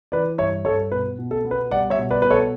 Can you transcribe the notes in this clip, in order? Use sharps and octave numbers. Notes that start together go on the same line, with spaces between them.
E3 B4 D5
G2 C#5 E5
G2 A4 C#5
B2 B4
B2
A4
B3
B4
G3 D5 F#5
C#5 E5
B2
B4 D5
B2 B4
A4 C#5